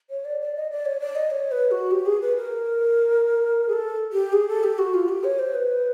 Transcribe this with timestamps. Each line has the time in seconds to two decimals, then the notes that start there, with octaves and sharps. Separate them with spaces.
0.10 C#5
0.25 D5
0.40 D5
0.55 D#5
0.71 D5
0.85 C#5
1.00 D5
1.15 D#5
1.30 C#5
1.51 B4
1.71 F#4
1.91 G4
2.06 G#4
2.21 B4
2.37 A#4
3.68 G#4
3.73 A4
4.13 G4
4.33 G#4
4.48 A4
4.64 G4
4.79 F#4
4.94 F4
5.09 G4
5.24 C#5
5.39 C5
5.54 B4